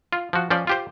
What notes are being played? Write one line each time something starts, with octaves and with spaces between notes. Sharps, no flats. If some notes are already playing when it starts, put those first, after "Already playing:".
F4
F3 F#4
F3 C#4 C5 D5
F4 G4 C5